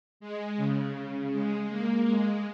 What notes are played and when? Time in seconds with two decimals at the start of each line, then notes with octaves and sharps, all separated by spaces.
0.20 G#3
0.57 C#3
1.33 G#3
1.70 A#3
2.06 G#3